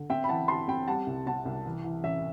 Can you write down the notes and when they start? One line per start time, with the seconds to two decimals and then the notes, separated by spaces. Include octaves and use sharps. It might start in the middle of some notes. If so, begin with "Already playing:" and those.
Already playing: D3
0.10 C4 E5 G5
0.24 B5
0.29 E3 F#5 A5
0.48 E3 A5 C6
0.68 C4 G5 B5
0.88 G3 F#5 A5
1.07 C2
1.26 C3 F#5 A5
1.45 C2
1.65 E3
1.84 E3
2.04 A1 E5